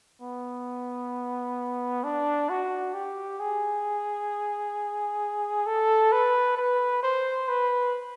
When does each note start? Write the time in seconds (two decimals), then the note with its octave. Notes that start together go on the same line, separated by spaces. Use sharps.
0.22 B3
2.04 D4
2.49 F#4
2.94 G4
3.40 G#4
5.66 A4
6.12 B4
6.57 B4
7.03 C5
7.48 B4